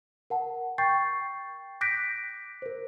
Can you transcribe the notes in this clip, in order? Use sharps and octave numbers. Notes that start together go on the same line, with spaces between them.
A#4 F#5 A5
G5 C#6 G6 A6 C7
D6 F#6 G6 A#6 B6 D7
A#4 C5